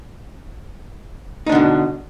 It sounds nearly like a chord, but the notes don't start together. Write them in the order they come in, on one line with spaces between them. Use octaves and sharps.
D#4 D4 D3 B2